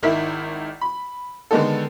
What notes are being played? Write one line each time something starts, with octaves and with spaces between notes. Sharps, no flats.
G#1 D#3 E4 E5
B5
D3 D#3 G#3 B3 A4